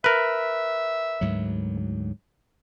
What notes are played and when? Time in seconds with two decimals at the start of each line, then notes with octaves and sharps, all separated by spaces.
0.04 A#4 B4 E5
1.21 D2 G#2 F#3